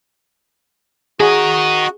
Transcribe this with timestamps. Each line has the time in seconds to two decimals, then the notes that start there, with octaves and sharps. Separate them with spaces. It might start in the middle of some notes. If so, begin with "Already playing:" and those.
1.20 F#4 G#4 A#4 D#5